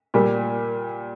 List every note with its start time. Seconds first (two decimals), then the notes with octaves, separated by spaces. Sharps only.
0.14 A#2 G3